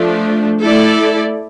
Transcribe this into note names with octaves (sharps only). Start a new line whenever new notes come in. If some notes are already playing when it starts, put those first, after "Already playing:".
Already playing: F3 A3 D4
A3 E4 A4 D5